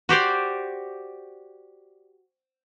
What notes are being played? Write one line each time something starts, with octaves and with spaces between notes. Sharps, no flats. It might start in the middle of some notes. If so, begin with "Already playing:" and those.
F#4 G4 C5 D5